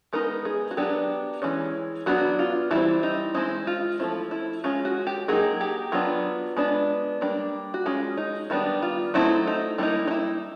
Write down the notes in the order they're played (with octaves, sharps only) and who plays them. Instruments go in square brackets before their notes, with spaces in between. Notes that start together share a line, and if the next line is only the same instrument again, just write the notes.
[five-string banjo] G#3 B3 D#4 A#4
G#4
F#4
F#3 B3 D4 G4
E3 G#3 C#4
F#3 B3 D4 F#4
F4
E3 G3 C4 E4
D#4
G#3 C4 D#4 E4
F4
F3 A3 C4 E4
E4
G#3 C#4 F4
F#4
G4
F#3 A#3 D#4 G#4
G4
F#3 B3 D4 F4
G#3 B3 D4
G3 A#3 D4
F#4
G#3 C#4 F4
D#4
D#3 G3 B3 D4 E4
F4
F#3 A3 C4 D#4 E4
D#4
G3 A#3 D#4 E4
D#4
E4